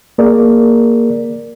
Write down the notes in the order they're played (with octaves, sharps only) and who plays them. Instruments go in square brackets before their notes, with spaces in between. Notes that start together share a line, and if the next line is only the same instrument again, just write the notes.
[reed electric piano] A#3 G#4 A#4 D5